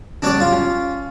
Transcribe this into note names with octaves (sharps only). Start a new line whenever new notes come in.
C#3 F#3 G3 D4 C#5 D5
F4
C#4